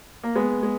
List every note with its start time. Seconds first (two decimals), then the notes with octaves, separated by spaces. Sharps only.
0.23 A#3
0.36 G#3 B3
0.63 G#3